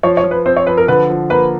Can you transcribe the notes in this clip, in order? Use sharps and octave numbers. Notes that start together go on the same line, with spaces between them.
F3 C#5
C#5
F3
B4
C4 C5
C#5
F3 B4
A#4
D3 B4
F3
A#3 B4